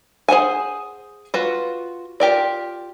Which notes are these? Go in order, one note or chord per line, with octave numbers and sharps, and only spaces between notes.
G#4 C5 F#5 G#5
F4 F#4 B4
F4 G4 A#4 D5